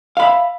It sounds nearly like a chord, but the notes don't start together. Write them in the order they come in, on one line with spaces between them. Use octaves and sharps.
F5 B5 E5